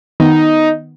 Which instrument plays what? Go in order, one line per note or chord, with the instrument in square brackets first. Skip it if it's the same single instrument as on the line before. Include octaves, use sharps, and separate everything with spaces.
[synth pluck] D#3 B3 [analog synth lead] D#4